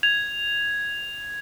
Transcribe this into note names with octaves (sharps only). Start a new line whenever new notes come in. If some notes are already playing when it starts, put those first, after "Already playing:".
G#6 F7